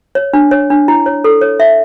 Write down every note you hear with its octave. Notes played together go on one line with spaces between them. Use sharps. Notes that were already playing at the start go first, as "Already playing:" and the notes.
C#5
D4
C#5
D4
E4
C#5
A4
C#5
E5